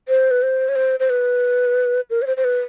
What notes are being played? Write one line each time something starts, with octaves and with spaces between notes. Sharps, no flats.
C5
B4
C5
C#5
C5
C5
B4
A#4
C#5
C5
C5
B4